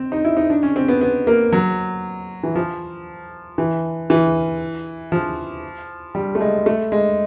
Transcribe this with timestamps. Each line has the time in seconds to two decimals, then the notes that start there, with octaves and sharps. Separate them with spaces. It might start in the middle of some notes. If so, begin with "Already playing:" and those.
Already playing: C4
0.12 D#4
0.25 E4
0.37 D#4
0.50 D4
0.63 C#4
0.76 C4
0.88 B3
1.01 B3
1.27 A#3
1.52 F#3
2.43 E3
2.55 F3
3.58 E3
4.10 E3
5.12 F3
6.15 G3
6.35 A3
6.41 G#3
6.66 A3
6.92 G#3